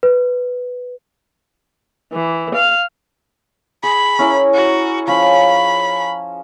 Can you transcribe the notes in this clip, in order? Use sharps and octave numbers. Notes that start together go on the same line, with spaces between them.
B4
E3
F5
G#4 B5
C#4 E4 A#4
F#4
F3 C#4 B5